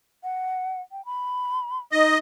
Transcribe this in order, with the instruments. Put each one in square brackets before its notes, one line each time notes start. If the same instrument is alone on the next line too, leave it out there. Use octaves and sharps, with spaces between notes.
[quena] F#5
G5
B5
[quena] D#4 [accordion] D#5